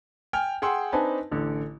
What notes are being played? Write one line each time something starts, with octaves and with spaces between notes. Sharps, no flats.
G5 G#5 F6
G#4 F#5 G5 C6 E6
C4 D4 D#4 B4 G#5 A5
A1 D3